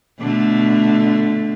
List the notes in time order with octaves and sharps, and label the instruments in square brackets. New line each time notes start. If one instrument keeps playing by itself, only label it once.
[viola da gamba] B2 D3 A3